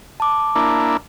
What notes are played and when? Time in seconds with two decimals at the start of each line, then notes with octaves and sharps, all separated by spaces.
0.20 A5 D6
0.55 A#3 D4 E4